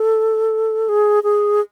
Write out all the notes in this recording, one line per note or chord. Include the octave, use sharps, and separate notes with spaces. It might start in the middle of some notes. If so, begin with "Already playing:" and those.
Already playing: A4
G#4
G#4